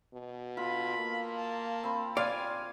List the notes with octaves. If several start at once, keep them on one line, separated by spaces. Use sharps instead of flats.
B2
F4 A4 B5
A#3
A5
C4 B5
D5 F5 G#5